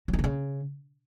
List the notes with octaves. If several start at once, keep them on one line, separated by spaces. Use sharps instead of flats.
F#3
D#3
D3
C#3